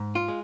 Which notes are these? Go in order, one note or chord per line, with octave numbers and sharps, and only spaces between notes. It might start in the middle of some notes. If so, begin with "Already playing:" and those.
Already playing: G#2
F4
G#3